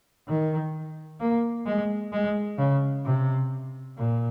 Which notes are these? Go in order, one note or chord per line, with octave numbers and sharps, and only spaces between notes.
D#3
A#3
G#3
G#3
C#3
C3
A#2